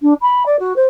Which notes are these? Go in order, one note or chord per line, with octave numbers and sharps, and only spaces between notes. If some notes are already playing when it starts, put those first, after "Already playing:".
D4
B5
D5
F#4
C5